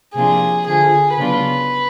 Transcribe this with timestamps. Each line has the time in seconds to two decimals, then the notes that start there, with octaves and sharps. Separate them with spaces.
0.15 C3 F3 A#3 D4 F4 G#4
0.67 D3 F3 A3 G#4
1.18 C#3 F#3 B3 D4 F4 B4